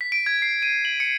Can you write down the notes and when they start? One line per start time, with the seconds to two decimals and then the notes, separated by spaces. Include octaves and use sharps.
0.01 B6
0.12 D7
0.26 G#6
0.42 C7
0.62 D#7
0.85 F#7
1.00 C#7